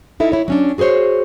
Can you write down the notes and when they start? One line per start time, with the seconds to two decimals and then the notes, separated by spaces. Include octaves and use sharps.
0.20 D#4 E4 A4 E5
0.32 E4 C#5
0.48 F#3 C#4 D4
0.78 F#4 G#4 A#4 C5 C#5